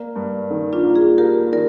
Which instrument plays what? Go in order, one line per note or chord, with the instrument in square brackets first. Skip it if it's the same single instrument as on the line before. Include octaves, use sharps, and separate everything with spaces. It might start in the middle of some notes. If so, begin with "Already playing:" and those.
Already playing: [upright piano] A#3 [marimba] A#4 D5
[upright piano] G2
D#3
[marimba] D4 F4
[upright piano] A#3
[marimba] F4 G#4
[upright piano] A#3 [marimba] G4 A#4
[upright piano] D#3 [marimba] A#4 D5